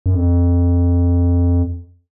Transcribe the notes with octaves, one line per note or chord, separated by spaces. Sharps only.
F#2
F2